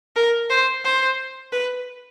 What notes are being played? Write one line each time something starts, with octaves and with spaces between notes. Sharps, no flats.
A#4
C5
C5
B4